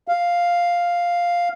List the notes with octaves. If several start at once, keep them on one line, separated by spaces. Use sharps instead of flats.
F5